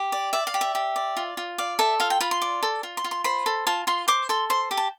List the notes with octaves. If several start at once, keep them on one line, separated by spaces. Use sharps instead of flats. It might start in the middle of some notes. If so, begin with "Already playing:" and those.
Already playing: G4
D5
D5 E5
F5
G4
E5
G4
D5
F4
F4
D5 F5
A4 E5
F4 F5
G5
F4 B5
C6
D5
A4
F4
C6
F4
C6
C5 B5
A4
F4 A5
F4 C6
C5 D6
A4 C6
C5 C6
G4
A5